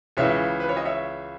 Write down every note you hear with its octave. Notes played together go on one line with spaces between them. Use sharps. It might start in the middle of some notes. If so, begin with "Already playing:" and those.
C#2 C#3 E3 C#5 E5
B4
C#5
D#5
C#5 E5